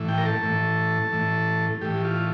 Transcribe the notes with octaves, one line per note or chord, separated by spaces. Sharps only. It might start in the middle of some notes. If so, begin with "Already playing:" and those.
Already playing: A2 E3
G5
A#4
A4
A2 E3
A2 E3
A2 E3 G4
F4